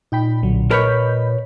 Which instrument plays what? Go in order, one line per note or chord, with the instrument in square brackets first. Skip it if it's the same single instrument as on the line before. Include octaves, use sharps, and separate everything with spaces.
[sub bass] A#2 [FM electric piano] D#4 G5 B5
[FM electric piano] B1 D3 F#3
[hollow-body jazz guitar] A#4 B4 C#5 [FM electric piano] D#5 B5 G6